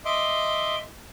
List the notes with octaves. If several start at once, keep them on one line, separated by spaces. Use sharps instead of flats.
D#5 E5 C6 D6